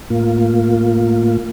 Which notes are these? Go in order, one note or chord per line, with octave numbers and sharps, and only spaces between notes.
A2 A#3 F4